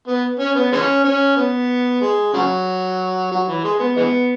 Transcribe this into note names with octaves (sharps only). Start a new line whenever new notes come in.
B3
C#4
B3
E3 G#3 C#4
C#4
B3
G#3
C#3 F#3
F#3
E3
G#3
B3
E3 G#3 B3